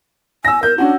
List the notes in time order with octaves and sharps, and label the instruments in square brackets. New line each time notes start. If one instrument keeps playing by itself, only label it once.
[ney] G#5 [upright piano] E6 A#6
[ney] A#4 [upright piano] G6
[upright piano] C#4 F#4 [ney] D4